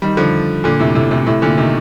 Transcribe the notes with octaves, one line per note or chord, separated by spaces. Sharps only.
D#3 G3
D3 F3
A#2 D3
A2 C3
A2 C3
A2 C3
A2 C3
A#2 D3
C3 D#3